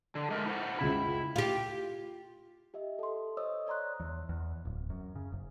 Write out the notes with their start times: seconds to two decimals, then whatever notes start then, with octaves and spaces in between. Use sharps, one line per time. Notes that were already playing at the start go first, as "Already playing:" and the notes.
0.15 D3
0.31 G#3 A3 A#4
0.46 E4 C5 F#5
0.79 C#2 C#3 E4 B5
1.36 F4 G4
2.74 G4 D#5 E5
2.99 A4 C6
3.37 C5 C#5 D#5 D#6 E6
3.67 C#5 D5 A#5 C6 F#6
4.00 E2
4.29 E2
4.65 D1
4.90 F#2
5.15 C#3
5.32 F#1